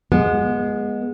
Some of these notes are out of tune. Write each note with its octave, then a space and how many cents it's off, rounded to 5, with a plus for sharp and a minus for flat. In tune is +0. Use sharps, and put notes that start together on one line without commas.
G#3 +0 B3 -25